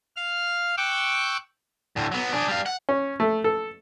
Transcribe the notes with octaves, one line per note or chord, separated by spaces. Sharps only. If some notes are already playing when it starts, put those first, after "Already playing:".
F5 F6
G5 C#6 D6 E6 F#6
D2 A2
F#3 B3
D4 G#4
G3 F5
F#5
C#4
A3
A4